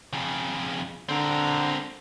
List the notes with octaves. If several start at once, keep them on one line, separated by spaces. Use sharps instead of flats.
F2 C#3
D3 C4 A#4